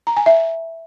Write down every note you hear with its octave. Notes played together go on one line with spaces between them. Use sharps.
A#5
G#5
E5